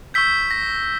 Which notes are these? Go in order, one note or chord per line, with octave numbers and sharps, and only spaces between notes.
C#6 E6 G6 B6
A#6